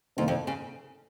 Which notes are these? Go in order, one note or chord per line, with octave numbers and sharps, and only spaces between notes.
F2 C3 D#3 A#3
F2
C#3